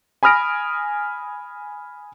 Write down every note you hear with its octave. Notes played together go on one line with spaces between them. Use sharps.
G#5 B5 D#6 F6 A#6 D7